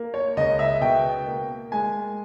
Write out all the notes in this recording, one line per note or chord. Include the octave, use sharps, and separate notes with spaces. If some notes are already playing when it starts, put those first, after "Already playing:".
Already playing: A#3
C#5
C#2 D#5
E5
B2 G5
A#3
G#3 G#5